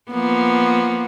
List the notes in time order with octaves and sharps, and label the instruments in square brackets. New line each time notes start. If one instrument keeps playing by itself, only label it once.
[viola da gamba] F3 A#3 B3